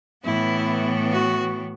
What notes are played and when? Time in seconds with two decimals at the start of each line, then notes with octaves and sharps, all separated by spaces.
0.24 A2 E3 B3 E4
1.11 F#4